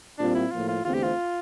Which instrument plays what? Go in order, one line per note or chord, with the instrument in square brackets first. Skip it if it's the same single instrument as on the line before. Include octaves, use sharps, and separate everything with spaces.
[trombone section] A#2 G3 C4 F4 [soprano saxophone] D4
[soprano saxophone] E4
[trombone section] A2 F3 A#3 [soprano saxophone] F4
[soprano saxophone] F4
[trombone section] E2 D3 A3 C4 [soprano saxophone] F4
[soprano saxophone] G4
F4